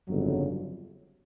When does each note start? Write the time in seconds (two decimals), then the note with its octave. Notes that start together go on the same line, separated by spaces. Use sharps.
0.08 G1 F2 C#3 F#3